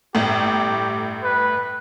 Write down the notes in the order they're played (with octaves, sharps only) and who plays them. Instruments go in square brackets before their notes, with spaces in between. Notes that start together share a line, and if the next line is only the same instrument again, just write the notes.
[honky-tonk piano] G1 A2 [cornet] G4
[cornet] B4